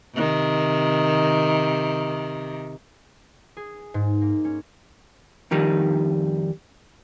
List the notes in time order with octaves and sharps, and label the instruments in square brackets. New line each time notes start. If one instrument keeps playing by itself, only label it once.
[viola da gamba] C3 D#3
[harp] G#4
G#2
A#3
C#4
[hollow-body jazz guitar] F2 D#3 G3 D#4